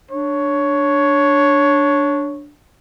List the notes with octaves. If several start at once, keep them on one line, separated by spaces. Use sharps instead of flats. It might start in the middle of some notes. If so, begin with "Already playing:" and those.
D4 C#5